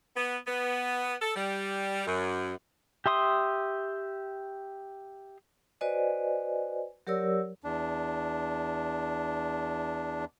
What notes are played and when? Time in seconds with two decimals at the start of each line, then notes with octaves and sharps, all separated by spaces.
0.16 B3
0.47 B3
1.21 A4
1.35 G3
2.06 F#2
3.06 G4 E5 C6 D#6
5.81 F#4 B4 C5 D5 D#5 G#5
7.07 F#3 G4 A#4 C#5 D5 E6
7.64 E2 D4